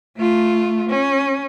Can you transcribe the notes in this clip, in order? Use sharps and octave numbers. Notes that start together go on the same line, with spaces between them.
A3 F4
C#4